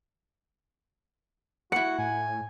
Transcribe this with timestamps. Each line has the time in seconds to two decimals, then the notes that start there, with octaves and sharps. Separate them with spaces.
1.72 E4 F#4 F#5 C#7
1.99 A2 G#5